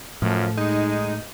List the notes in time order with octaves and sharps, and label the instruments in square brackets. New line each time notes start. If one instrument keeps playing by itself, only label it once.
[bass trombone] F#2 [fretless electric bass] A2 A3 [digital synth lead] F3
[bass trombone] G#3 [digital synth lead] D#4